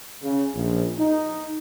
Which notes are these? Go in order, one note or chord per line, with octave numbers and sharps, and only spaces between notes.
C#3
A#1
D#4